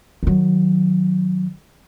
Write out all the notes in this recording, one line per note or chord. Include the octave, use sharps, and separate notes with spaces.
D#3 F#3